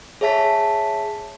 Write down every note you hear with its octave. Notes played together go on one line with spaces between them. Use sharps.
G#4 C#5 E5 A5 B6